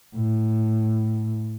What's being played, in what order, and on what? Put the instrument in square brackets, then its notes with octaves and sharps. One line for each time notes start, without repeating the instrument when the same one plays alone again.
[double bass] A2